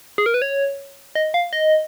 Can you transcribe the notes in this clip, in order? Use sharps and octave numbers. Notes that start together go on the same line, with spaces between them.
G#4
A#4
B4
C#5
D#5
F5
D#5